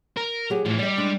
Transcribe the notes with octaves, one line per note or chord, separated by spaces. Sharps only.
A#4
F#3 G4 G#4
A2 E3 F3
G3 D5 D#5
G#3 D4